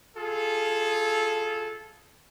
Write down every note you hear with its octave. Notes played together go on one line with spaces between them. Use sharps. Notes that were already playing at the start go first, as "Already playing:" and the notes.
F4 G#4 A4